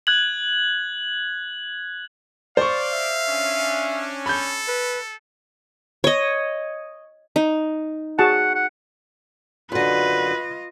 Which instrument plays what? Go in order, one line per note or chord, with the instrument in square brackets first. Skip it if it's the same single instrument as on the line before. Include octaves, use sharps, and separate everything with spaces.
[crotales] F#6 G#6 F#7
[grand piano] C5 C#6 [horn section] D5 [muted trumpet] F5
[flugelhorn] E5
[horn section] C#4 D4
[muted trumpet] A4 [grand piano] B5 G6
[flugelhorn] B4
[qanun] C#5 D#5
D#4
[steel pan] F#4 G#4 A5 [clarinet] F#5
[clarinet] F#5
[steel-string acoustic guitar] F#2 D3 [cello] F4 D#5 [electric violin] B4